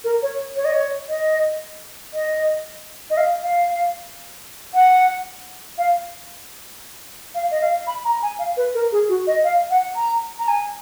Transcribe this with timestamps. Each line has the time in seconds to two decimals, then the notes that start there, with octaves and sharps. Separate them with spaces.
0.04 A#4
0.22 C#5
0.56 C#5
0.65 D#5
0.73 C#5
1.09 D#5
2.13 D#5
3.10 D#5
3.17 F5
3.43 F5
4.74 F#5
5.78 F5
7.35 F5
7.51 D#5
7.61 F5
7.87 B5
8.05 A#5
8.23 G#5
8.39 F5
8.57 B4
8.74 A#4
8.92 G#4
9.09 F#4
9.27 D#5
9.44 F5
9.70 F#5
9.96 A#5
10.39 A#5
10.48 G#5